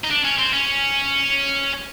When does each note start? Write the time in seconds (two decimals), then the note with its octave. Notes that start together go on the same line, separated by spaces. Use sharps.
0.04 D#4
0.11 D4
0.25 C#4
0.39 C4
0.53 C#4